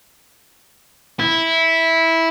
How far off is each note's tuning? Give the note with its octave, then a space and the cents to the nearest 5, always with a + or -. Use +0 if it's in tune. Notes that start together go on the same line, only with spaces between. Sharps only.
E4 -10